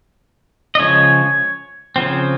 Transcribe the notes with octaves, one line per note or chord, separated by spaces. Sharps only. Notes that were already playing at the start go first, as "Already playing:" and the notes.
D#5
C#3 F3 G#3 C#5
C#3 F3 C4